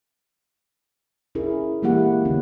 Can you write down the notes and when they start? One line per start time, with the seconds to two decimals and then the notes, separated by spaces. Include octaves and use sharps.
1.35 C#4 E4 G#4 A#4
1.82 E3 G#3 A#3 E4 G4 F#5
2.25 D3 A#3 B3 C#4